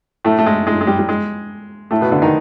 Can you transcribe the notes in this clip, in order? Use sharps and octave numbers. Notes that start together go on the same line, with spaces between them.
A2 A3
A3
G#3
G#3
G#3
G3
G3
G#3
A2 A3
B2 B3
D3 D4
D#3 D#4